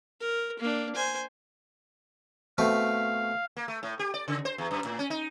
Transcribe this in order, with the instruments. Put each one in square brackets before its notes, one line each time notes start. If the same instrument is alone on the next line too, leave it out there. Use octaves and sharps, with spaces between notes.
[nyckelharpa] A#4
A#3 D4
C5 G#5
[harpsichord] B2 A3 C4 [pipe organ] F5
[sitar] A#3
A3
A2
G4
D5
C#3
C5
E2
F#2
A2
C#4
D#4